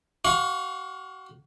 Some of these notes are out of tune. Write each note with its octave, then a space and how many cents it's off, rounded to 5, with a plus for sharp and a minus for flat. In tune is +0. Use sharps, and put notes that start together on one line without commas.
F#4 +35 F5 +35 C#6 -25